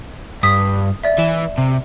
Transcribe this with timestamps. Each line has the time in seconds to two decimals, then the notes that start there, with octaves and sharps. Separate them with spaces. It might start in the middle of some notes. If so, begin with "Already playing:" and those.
0.43 G2 D#6 B6
1.04 D5 E5
1.19 E3 E7
1.58 C3